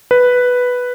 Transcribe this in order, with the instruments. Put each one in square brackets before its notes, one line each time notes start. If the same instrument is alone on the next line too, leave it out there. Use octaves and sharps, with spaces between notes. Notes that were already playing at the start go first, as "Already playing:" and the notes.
[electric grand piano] B4